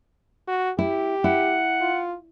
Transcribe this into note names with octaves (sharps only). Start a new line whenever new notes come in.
F#4
E4 G4
E4 F#5
F4